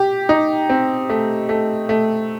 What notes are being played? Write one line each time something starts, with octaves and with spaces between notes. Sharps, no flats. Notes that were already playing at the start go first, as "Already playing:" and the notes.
Already playing: G4
D#4
C4
A3
A3
A3